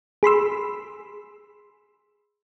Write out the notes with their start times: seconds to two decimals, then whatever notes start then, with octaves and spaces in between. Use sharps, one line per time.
0.23 G#4 B5 C6 E6